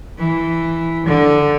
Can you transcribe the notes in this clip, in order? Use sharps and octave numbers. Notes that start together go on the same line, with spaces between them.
E3
D3